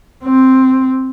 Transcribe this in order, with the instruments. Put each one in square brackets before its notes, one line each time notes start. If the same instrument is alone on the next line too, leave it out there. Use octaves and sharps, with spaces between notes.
[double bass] C4